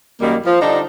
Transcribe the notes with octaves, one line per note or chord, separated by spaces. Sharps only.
F#2 D#3 G3 A#3
F3
D3 G3 D4 D#4